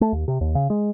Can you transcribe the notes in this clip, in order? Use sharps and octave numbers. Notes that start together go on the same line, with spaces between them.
A3
D#2
C3
D#2
C#3
G#3